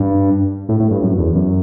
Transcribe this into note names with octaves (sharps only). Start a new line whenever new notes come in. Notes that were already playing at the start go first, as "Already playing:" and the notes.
Already playing: G2
A2
A2
G2
F#2
E2
F#2